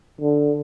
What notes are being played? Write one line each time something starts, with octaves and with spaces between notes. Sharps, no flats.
D3